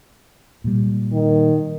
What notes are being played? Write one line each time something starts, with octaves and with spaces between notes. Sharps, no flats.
A#2 G3
D#3